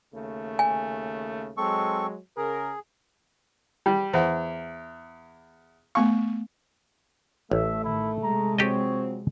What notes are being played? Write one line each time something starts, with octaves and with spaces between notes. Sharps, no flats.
D#2 C#3 A3
G#5
F#3 G#3 C4 A4 C#6
C#3 G#4 A#4
G3
E2 C5 F#5
A3 B3 F5 C#6
A1 A3 E5
A2 D#3 E4
C3 G#3 A#5
F2 F#3 C4 G4 A4 C#5 D#5